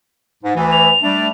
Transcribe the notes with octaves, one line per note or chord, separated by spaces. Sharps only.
G#2
D2 E3
F7
G3 A3 D4